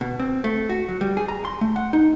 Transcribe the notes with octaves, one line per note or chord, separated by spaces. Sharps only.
B2
C4
A3
F#4
F#3
G3
G#4
A#5
C6
A3
F#5
D#4